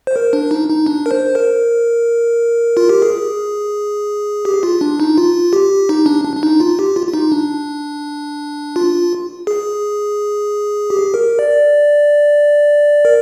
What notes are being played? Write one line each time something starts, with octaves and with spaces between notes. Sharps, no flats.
C5
A#4
D4
D#4
D#4
D4
A#4
C5
A#4
F4
G4
G#4
G4
F4
D4
D#4
F4
G4
D#4
D4
D4
D4
D#4
F4
G4
F4
F4
D#4
D4
F4
G#4
G4
A#4
D5
A#4